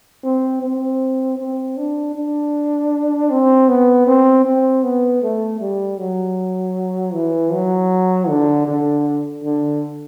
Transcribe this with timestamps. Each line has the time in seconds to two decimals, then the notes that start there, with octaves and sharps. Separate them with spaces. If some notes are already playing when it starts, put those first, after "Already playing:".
0.24 C4
0.62 C4
1.38 C4
1.77 D4
2.15 D4
3.30 C4
3.69 B3
4.07 C4
4.45 C4
4.84 B3
5.23 A3
5.61 G3
5.99 F#3
7.14 E3
7.52 F#3
8.29 D3
8.68 D3
9.44 D3